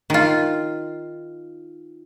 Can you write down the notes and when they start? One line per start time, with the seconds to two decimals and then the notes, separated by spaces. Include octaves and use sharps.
0.10 D#3 F4